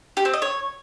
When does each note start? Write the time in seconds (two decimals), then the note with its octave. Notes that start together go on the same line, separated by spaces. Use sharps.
0.17 G4
0.25 C4
0.33 D#5
0.42 C#5